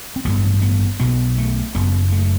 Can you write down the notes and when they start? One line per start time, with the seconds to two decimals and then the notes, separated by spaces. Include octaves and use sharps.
0.16 C4
0.25 A1 G2 B3
0.62 B3
1.00 B1 B2 B3
1.38 A3
1.75 F#1 F#2 B3
2.12 A3